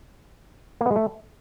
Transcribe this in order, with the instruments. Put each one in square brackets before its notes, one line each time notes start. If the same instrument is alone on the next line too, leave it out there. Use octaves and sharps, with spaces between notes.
[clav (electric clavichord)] A#3
B3
G#3
A3